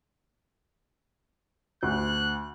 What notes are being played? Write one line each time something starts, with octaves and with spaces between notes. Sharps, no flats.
D2 F#6